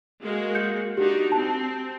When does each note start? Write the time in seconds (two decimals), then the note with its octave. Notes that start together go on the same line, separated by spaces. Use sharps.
0.22 G#3 A#3 F#4
0.55 G6 C#7
0.97 D4 D#4 F#4 G4
1.32 C4 A5